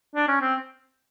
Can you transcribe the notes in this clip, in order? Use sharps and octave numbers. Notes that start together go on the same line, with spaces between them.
D4
C#4
C4